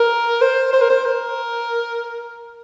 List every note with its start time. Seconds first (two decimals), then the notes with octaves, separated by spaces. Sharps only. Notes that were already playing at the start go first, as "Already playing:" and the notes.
Already playing: A#4
0.41 C5
0.73 C5
0.81 A#4
0.90 C5
1.05 A#4